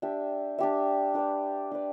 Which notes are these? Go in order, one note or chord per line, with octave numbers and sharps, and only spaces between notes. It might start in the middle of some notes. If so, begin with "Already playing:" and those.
D4 G4 E5
D4 G4 E5
D4 G4 B4 D5
D4 G4 B4 D5